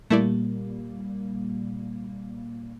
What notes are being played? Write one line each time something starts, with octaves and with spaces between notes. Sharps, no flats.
A#2 G3 A3 A#3 E4 D5